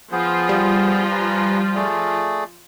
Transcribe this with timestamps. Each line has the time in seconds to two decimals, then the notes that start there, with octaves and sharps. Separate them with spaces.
0.12 F3 B3 F4 G#4 C5
0.49 G3
1.12 B4 G#5 A#5
1.75 A3 G#4 D5